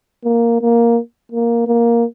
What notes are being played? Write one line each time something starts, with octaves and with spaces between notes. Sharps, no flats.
A#3
A#3
A#3
A#3